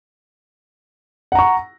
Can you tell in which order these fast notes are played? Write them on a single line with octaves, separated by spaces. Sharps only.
F#5 A#5 C#6